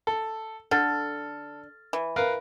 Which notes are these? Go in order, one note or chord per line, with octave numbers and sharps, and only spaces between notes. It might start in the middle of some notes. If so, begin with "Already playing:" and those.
A4
D3 A4 F6 A6
E3
A#4 B4 F5